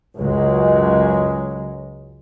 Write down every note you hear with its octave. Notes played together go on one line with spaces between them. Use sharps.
C#2 F#2 F#3 G#3